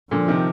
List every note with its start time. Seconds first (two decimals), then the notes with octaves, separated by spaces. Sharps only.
0.11 A#2 D3 F3
0.28 C3 D#3